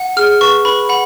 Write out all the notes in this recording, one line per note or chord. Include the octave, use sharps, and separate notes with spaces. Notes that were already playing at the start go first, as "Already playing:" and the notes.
Already playing: F#5
G#4 F6
B4 C#6
B4 B5
F#5 B5